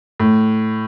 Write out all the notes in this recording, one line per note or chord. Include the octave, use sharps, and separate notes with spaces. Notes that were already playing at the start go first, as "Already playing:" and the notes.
A2